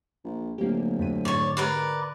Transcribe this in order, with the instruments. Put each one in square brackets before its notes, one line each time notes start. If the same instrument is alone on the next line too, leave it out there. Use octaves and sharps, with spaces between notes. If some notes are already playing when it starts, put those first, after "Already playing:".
[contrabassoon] A#1
[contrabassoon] D1 [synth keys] A#3 G4
[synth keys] F2 B6 D#7
[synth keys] G#2 D3 [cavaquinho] C#5 D5
[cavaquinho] A#4 B4 D5